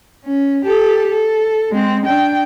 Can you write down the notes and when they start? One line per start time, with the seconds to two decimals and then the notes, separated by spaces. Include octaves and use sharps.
0.25 C#4
0.65 G4 A4
1.11 A4
1.71 G#3 C4
2.06 D4 G5